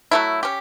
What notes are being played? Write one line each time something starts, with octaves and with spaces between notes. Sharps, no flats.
F#3 A3 E4
C#4 G4